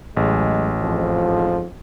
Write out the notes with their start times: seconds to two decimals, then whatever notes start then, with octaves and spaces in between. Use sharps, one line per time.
0.17 A1 F#3 G#3
0.81 F2 G#2 F3